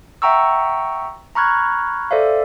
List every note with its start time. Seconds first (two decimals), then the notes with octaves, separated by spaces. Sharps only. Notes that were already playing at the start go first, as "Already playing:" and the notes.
0.22 E5 F#5 G5 A#5 C#6 E6
1.35 A#5 B5 C#6 F6 F#6 G#6
2.11 A4 C5 D5 E5 F5